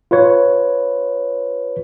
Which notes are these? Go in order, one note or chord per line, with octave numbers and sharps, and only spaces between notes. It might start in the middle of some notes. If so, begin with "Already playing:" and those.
F4 B4 C#5